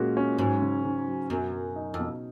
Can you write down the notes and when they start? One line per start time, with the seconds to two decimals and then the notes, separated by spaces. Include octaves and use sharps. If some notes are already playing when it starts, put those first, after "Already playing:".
Already playing: A#2 G#3 C#4 F#4
0.17 C#4
0.38 G#2 F#3
0.62 C#3
0.84 C#3
1.08 F#3
1.30 F#2 B2
1.53 F#3
1.76 D#4
1.94 F2
1.99 B2